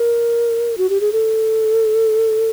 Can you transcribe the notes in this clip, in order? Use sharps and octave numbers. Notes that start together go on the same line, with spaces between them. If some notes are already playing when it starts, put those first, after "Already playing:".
Already playing: A#4
F#4
G4
G#4
A4